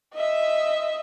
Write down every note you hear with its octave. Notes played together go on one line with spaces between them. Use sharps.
D#5 E5